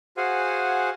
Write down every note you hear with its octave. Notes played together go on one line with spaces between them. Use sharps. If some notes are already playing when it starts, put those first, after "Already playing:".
F#4 G#4 C5 F5 F#5 G#5